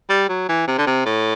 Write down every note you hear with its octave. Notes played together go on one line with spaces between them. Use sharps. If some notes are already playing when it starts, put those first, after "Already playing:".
G3
F#3
E3
C3
D3
C3
A2